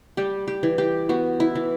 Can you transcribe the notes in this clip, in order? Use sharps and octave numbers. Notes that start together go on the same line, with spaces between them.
G3 G4
G4
E3
G4
B3 F#4
E4
E3